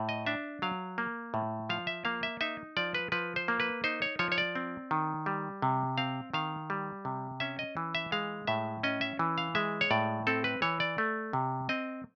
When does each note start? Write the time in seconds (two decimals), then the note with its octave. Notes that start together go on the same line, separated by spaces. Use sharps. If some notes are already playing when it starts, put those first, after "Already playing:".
Already playing: A2
0.09 D#5
0.26 D4 E5
0.62 F#3 F5
0.98 A#3
1.34 A2
1.69 F3 F5
1.87 E5
2.05 A#3 F5
2.23 E5
2.41 D#4 E5
2.77 F3 D5
2.95 B4
3.12 F3 B4
3.36 C5
3.48 A#3
3.60 B4
3.84 D#4 C5
4.02 C#5
4.19 F3 C#5
4.32 C#5
4.38 D5
4.55 C4
4.91 D#3
5.26 G3
5.62 C3
5.98 C4 F5
6.34 D#3 F5
6.70 G3
7.05 C3
7.40 C#4 E5
7.59 D#5
7.77 E3
7.95 E5
8.12 G#3 F5
8.47 A2 E5
8.83 C#4 D#5
9.01 E5
9.19 E3
9.38 F5
9.55 G#3 E5
9.81 C#5
9.91 A2 D5
10.27 C4 A4
10.44 B4
10.62 E3 C#5
10.80 D5
10.98 A3
11.33 C3
11.69 C4 D#5